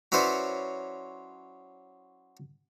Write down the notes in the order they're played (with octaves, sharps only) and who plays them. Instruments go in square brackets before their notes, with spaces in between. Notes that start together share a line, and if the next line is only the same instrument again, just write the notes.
[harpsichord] F#3 C#4 E4 B4 C5 D5